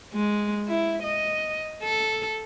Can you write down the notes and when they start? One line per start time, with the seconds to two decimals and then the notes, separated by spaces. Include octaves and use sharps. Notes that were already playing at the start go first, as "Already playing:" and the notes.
0.13 G#3
0.68 E4
1.03 D#5
1.83 A4